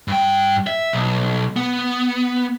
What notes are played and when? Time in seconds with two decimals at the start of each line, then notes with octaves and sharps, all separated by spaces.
0.08 G2 G5
0.67 E5
0.93 B1
1.56 B3